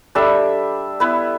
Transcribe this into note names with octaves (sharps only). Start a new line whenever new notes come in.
G3 D4 A4 E5
B3 E4 B4